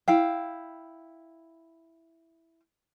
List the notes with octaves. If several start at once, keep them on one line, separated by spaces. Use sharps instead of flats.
E4 F5 G5